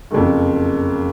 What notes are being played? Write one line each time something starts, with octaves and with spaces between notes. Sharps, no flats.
F#1 F2